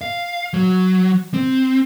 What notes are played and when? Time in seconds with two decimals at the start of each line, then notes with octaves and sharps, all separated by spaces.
0.01 F5
0.54 F#3
1.34 C4